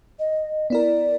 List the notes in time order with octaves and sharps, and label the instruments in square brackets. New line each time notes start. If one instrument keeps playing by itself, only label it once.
[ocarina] D#5
[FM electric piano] B3 E4 A#4 [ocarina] D5